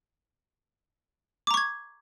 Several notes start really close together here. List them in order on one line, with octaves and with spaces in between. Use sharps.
D6 A#5 C#6 G#6